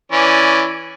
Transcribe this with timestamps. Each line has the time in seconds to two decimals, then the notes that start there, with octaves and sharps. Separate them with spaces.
0.12 E3 C#4 D5